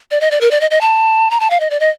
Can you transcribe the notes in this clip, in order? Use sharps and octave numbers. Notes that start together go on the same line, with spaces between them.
D5
D#5
D5
A#4
D5
D#5
D#5
A5
A#5
A5
F5
D#5
D5
D#5